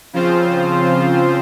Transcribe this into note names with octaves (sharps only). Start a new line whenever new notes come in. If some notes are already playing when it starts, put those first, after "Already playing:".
C#3 F3 C4 F4 C5